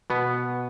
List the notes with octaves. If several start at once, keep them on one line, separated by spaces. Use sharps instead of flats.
B2 B3